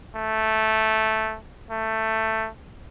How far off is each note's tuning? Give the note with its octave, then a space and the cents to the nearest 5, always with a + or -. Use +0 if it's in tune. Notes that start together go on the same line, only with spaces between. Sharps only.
A3 -5
A3 +10